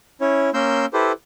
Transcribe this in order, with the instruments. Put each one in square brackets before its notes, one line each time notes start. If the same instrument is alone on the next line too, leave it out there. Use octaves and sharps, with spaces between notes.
[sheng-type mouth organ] C#4 E4 C#5
A#3 C#4 A#4 C6 E6 G6
E4 G4 A4 B4 C5